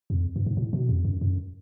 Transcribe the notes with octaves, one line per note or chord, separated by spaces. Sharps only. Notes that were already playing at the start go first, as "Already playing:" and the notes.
F2
G2
G#2
A2
B2
F2
F#2
F#2